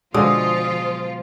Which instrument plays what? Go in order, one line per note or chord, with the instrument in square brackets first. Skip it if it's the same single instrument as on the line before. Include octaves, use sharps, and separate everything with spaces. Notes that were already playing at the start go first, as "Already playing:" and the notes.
[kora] B2 G#3 [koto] D3 [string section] F3 F4 [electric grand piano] D#6